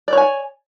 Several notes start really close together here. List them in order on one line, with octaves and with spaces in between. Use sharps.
D5 C#5 G#5